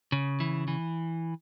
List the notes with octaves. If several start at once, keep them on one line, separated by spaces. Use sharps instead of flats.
C#3
E3
E3